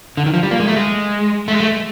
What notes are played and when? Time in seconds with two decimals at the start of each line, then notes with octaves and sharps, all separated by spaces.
0.17 D3
0.26 D#3
0.34 F3
0.43 G3
0.51 A#3
0.60 G#3
0.68 A3
0.76 G#3
1.48 A3
1.52 G#3
1.60 A3